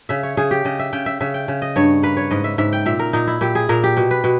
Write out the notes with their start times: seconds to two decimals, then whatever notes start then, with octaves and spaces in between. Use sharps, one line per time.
0.09 C#3 E5
0.23 C#5
0.37 C#3 G#4
0.51 G4
0.65 C#3 D#5
0.79 E5
0.93 C#3 G5
1.06 E5
1.20 C#3 E5
1.34 G5
1.48 C#3
1.62 D#5
1.76 G2 C#5
2.03 A#3 B4
2.17 C#5
2.31 G#2 D#5
2.44 E5
2.58 G#2 E5
2.73 G5
2.86 A#2 E5
2.99 A#4
3.13 A#2 D#4
3.27 E4
3.41 A#2 G4
3.55 G#4
3.69 A#2 A#4
3.84 G4
3.97 B2
4.11 B4
4.24 B2